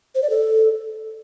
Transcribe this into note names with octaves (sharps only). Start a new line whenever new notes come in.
C5
D5
A4